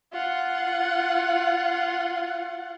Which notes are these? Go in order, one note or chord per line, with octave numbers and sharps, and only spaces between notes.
F4 F#5